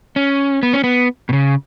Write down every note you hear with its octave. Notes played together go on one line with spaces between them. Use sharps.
C#4
B3
C#4
B3
B2
C#3